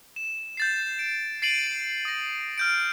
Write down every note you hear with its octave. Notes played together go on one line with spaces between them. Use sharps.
E7
G6 A6 C7
D7
A6 C7 D7 D#7 F#7
D#6 A#6
F6 G6 D7